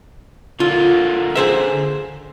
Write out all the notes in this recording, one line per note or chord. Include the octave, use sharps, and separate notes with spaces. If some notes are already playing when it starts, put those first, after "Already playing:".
D3 A#3 F4
G#4 C5 E5